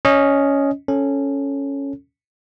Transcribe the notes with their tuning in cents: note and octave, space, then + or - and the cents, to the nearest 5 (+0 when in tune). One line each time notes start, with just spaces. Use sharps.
C#4 +10 D#5 +0
C#4 +0 A4 +0